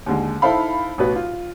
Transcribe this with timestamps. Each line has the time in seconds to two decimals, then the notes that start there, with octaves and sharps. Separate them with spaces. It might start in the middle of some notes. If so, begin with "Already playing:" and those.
0.06 D#2 D3 G#3
0.42 D#4 E4 A4 C5 F5 B5
0.98 A1 B2 F#4 B4
1.16 F4